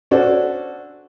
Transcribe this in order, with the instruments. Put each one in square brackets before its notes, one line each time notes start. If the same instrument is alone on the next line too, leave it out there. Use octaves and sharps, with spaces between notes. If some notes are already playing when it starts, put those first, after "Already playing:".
[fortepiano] C#4 D4 F#4 A4 C5 D5